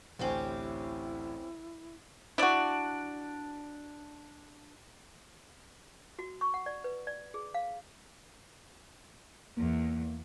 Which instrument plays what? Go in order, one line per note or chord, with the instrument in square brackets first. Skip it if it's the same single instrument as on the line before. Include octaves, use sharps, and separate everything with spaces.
[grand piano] A1 D2 G#5 [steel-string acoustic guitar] C4 C#4 G4 [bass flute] E4
[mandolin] D4 D5 [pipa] E4 F#4
[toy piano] F#4
C#6
F#5
D5
B4
D5
G#4
F5
[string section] E2 [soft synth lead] A#3